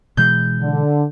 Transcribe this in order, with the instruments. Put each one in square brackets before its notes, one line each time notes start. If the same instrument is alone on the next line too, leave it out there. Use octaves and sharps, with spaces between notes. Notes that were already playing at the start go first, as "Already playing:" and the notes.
[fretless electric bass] B2 E3 G#3 [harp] G6
[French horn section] D3